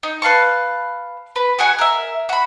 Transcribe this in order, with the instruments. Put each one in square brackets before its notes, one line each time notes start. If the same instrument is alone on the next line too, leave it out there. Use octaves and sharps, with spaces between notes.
[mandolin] D#4
B4 F5 A5 C#6
B4
F#4 G#4 F#5 G#5
A#4 E5
F#4 B5